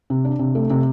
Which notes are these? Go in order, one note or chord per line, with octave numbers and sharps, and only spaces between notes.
C3
D4
C3
A3
C3